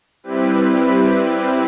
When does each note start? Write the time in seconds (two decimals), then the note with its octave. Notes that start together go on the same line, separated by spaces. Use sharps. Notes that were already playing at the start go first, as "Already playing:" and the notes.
0.23 G3 C4 E4 G4 B4